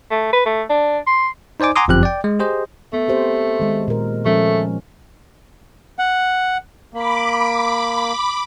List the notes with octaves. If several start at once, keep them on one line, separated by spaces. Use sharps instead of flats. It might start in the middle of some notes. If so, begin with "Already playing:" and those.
A3
B4
A3
D4
C6
D#4 C5 D5 G#5 D6
F#5 G#5 A#5 C6 D6 D#6
G1 F#2 F3 C4 G4 F#6
D5 G5
G#3
G4 G#4 C5 D#5
A3 B3
C4 G4 C5
D#3 G#3
A#2 A#4
F3 G#3 A3 C#4
F#5
A#3 B5 D6